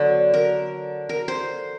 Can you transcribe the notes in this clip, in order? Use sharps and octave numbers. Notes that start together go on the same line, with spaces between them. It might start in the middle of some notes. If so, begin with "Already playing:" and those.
Already playing: D3 F#3 B3
A#4
A#4
C5